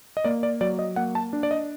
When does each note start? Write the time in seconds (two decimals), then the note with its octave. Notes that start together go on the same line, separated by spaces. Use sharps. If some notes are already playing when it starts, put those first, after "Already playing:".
0.17 D#5
0.25 A#3 D5
0.43 D5
0.61 F#3 D5
0.79 D#5
0.96 A#3 F#5
1.15 A5
1.33 D4
1.43 D5
1.51 D#5